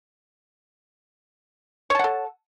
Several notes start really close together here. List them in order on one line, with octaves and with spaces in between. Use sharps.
C#5 A5 F#5 A4